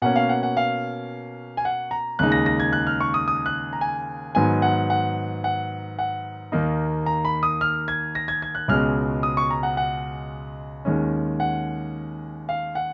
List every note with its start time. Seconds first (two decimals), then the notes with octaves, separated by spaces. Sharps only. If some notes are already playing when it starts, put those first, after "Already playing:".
0.02 B2 A#3 C#4 F#5
0.16 F5
0.29 F#5
0.43 F#5
0.57 F5
1.57 G#5
1.65 F#5
1.91 A#5
2.19 D#2 C#3 G#3 D#4 F#6
2.32 A#6
2.46 A#6
2.60 G#6
2.73 F#6
2.87 F6
3.00 C#6
3.14 D#6
3.28 D#6
3.46 F#6
3.73 A#5
3.81 G#5
4.35 G#2 D#3 F#3 B3 G#5
4.62 F#5
4.90 F#5
5.44 F#5
5.99 F#5
6.52 D#2 D#3 A#3 D#4
7.06 A#5
7.25 B5
7.43 D#6
7.61 F6
7.88 G#6
8.15 A#6
8.28 G#6
8.42 G#6
8.55 F#6
8.68 C#2 B2 G#3 C#4 F6
9.23 D#6
9.37 C#6
9.50 A#5
9.63 F#5
9.77 F#5
10.85 D#2 D#3 G#3 C#4
11.40 F#5
12.49 F5
12.75 F#5